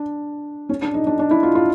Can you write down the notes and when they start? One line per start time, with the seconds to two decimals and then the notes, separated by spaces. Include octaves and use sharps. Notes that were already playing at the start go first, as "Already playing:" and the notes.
Already playing: D4
0.69 C#4
0.82 D4
0.94 D#4
1.07 D4
1.19 D4
1.31 E4
1.43 F4
1.55 F4